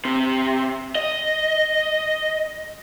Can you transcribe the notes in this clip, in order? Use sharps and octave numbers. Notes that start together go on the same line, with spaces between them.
C3
D#5